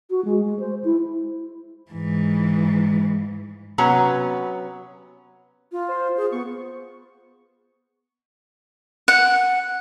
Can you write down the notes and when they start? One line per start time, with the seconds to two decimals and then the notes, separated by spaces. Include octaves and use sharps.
0.10 F#4
0.25 G#3
0.45 G#3
0.60 C5
0.84 E4
1.92 G#2 E3
3.78 C3 F#3 B3 C#4 A#5
5.72 F4
5.88 C5
6.17 G#4
6.32 B3 C#6
9.08 F#5